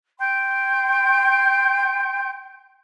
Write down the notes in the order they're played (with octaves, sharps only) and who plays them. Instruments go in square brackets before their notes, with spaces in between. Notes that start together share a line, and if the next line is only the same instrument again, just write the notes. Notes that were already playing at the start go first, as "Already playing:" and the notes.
[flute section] G5 C6 G6